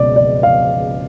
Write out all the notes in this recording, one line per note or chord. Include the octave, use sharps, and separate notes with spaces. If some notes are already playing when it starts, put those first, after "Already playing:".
Already playing: C#2 B2 D5
D5
F5